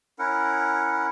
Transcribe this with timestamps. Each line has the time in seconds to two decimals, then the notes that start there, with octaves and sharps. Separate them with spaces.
0.19 C#4 E4 A#4 F#5